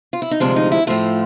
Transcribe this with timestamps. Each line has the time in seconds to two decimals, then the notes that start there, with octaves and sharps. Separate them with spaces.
0.13 F4
0.22 E4
0.31 D#4
0.40 D2 C3 F3 G#3 D4
0.56 D#4
0.72 E4
0.87 A2 F3 A3 F4